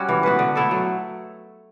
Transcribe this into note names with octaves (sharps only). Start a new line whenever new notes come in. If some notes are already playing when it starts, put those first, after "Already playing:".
Already playing: G3 C#4 F#4
E3
B3 F#4 B4
D3
A3 E4 A4
F#3